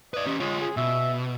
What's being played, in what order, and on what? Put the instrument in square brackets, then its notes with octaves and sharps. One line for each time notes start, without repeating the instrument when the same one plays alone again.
[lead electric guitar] B4 D5 [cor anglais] D#5
[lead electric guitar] C#4 G4
[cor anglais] G#3 [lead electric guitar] F4 C#5
[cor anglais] G#4
[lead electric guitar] B2 [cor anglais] E5